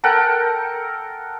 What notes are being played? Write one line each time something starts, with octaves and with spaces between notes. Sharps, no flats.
A4 A#4 F#5 G5